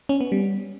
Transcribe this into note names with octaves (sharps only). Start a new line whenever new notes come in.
C#4
B3
G3